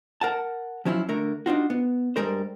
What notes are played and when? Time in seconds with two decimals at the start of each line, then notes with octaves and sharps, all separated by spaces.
0.21 A#4 F#5 A5
0.85 F3 F#3 C#4 E4 F4
1.09 D3 A3 A#4
1.46 D4 D#4 F4 F#4
1.70 B3
2.16 G2 G3 G#3 A#4 C5